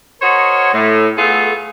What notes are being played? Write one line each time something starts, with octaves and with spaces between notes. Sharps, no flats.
F#4 A#4 C5 C#5 D#5
A2
A3 B3 F4 G#4 A4